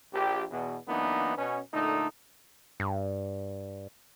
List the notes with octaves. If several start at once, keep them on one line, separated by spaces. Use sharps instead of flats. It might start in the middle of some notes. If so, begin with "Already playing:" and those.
A#1 G4
E2 B2
F#2 E3 A#3 B3 D4 D#4
B2 C#4
A#2 D3 A3 D#4
G2